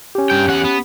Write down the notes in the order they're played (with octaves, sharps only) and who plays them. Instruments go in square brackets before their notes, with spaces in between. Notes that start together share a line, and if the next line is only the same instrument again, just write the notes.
[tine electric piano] C#4 G4
[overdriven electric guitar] G2 G5
E2 F#5
B3